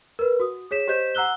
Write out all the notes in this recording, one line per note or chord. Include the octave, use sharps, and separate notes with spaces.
A#4 B4
F#4 D#6
G#4 C#5 B6 E7
G4 C5 D#5 G6 B6 E7
F#5 A#5 E6 F#6 G7